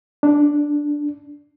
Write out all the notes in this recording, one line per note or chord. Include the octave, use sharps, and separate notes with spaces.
D4